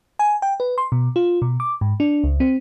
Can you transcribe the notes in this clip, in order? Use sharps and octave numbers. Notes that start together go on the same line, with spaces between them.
G#5
G5
B4
C6
B2
F4
B2
D6
G#2
D4
C#2
C4